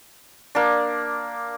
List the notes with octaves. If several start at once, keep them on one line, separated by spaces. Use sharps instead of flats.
A#3 D4